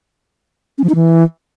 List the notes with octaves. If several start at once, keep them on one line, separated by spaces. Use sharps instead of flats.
C#4
F3
D#4
E3